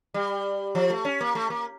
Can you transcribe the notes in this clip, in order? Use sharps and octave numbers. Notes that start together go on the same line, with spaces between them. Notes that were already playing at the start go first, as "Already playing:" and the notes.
G3
F3
A3
C#4
A#3
A3
A#3